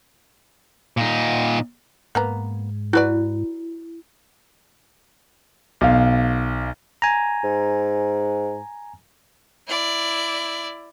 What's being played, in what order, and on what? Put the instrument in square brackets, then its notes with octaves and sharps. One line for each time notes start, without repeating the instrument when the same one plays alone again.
[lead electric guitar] A#2 D#4
[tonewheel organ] G#2 [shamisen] A#3 B3 A#5
[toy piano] E4 [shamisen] F#4 B4 D5
[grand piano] B1 F5
[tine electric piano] G#5 A#5
[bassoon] G#2
[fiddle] E4 D5